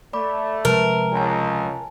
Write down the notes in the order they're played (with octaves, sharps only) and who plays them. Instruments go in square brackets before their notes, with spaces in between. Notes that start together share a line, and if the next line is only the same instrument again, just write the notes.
[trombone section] A3 [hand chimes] D5 B5 D6
[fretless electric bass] C3 F3 G#3 [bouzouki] A#4 [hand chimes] B4 E5 A5
[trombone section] C#2 [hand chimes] G#5 A5